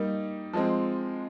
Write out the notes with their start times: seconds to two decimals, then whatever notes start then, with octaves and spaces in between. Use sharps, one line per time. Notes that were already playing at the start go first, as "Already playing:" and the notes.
Already playing: G3 A#3 D#4
0.53 F3 G#3 C4